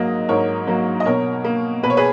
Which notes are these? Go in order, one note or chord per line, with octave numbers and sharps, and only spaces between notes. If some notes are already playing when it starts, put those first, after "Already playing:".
Already playing: G#2 F#3 A#3 D#5
G#2 A#4 C#5
F#3 A#3
D#5
B2 A#4 C#5
A#3
B2 B4
C#5
G#4 B4